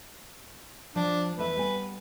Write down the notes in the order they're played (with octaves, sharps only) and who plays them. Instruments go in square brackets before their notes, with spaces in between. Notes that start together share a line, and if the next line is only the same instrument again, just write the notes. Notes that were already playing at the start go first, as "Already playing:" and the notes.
[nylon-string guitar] F3 [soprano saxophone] D4
[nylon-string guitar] E2 A3 E5 [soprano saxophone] B4
[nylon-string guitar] G3 B3 G#5